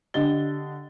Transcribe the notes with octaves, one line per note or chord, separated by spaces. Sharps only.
D3 D4 G4 D#5 A6 G7